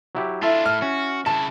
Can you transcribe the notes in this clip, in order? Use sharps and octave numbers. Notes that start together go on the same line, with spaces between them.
F#3 E4 G4
D4 E4 F4 A4
A2 F6
C#4 F#4
C#3 E4 A5